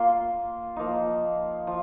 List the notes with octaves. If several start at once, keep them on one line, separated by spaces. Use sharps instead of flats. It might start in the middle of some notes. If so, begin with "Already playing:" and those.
Already playing: A#3 F4 C6
F3 A#3 D#4
F3